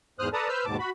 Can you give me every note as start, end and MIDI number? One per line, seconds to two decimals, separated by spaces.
0.19 0.29 40
0.19 0.29 44
0.19 0.29 72
0.19 0.29 87
0.19 0.29 89
0.19 0.29 90
0.33 0.48 69
0.33 0.48 71
0.33 0.48 74
0.33 0.48 81
0.33 0.48 82
0.33 0.48 87
0.49 0.65 71
0.49 0.65 72
0.49 0.65 88
0.49 0.65 89
0.49 0.65 91
0.65 0.77 39
0.65 0.77 44
0.65 0.77 47
0.65 0.77 81
0.65 0.77 86
0.79 0.90 66
0.79 0.90 83